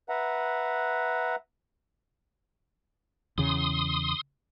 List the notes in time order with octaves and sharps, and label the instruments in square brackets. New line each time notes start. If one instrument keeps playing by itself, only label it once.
[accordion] B4 E5 F#5 A#5
[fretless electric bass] E2 C#3 [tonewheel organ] C6 D#6